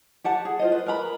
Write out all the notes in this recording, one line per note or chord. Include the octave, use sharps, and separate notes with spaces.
G4 F#5 A5
G#4
F4 C5 D#5
B4
A#4 B4 A#5 B5